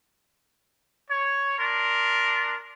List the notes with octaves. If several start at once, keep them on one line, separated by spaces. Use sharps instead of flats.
C#5
D4 A#4 C6